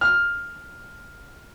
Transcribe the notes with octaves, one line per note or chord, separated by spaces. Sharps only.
F6